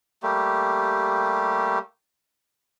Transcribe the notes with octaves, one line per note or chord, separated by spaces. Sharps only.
G3 A3 A#3 G4